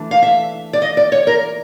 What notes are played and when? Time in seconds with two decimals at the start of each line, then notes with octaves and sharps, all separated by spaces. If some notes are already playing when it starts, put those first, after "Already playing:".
Already playing: E3 A3 D4
0.11 F5
0.22 E5
0.73 D5
0.82 D#5
0.97 D5
1.12 C#5
1.27 A#4